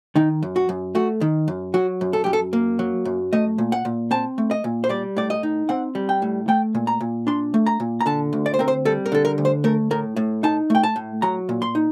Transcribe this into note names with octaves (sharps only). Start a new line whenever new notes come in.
D#3 D#4
F#2
F#4
F#2
A3 F#4
D#3
F#2
F#3 F#4
F#2
A4
F#2 G4
A4
A#3
F#3
F#2
A3 D#5
A#2
F#5
A#2
C4 A5
A3
D#5
A#2
C5
G3 D5
A2 D5
D#5
D#4
C4 F#5
G3
G5
A2
A3 G5
A#2
A#5
A#2
D4 C6
A3
A#5
A#2
A#5
D3 A5
D2
D5
C5
C4 A#4
C5
G3 A4
A#4
D3 A4
A#4
D2
C5
A3 A#4
A2 A#4
A2
D#4 A5
A3 G5
A5
A2
F#3 A#5
A#2
C6
D#4